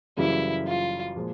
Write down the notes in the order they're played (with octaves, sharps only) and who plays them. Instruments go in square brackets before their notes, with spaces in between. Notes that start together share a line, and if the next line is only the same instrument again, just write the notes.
[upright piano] F#1 F#2 C#3 E3 G3 [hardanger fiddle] E4
[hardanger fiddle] F4
[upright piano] A#2 F3 G#3